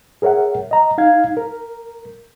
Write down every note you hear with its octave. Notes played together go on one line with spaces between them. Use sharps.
G#4 A#4 C#5 E5 F#5
D#5 A#5
D#4 F5 G#6
A#4